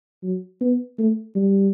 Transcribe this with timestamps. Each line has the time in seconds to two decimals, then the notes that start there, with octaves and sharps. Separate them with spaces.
0.24 F#3
0.61 B3
0.99 A3
1.36 G3